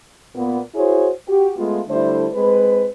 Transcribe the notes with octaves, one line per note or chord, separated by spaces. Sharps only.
A#2 A#3 B3
E4 F#4 G#4 C5 C#5
F#4 G4
G#3 A3 B3 F4
D3 G3 A3 E4 C5
G#3 C4 B4